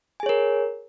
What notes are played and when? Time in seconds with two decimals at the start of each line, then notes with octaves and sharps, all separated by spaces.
0.20 G#5
0.23 G#4
0.26 C#5
0.29 A#4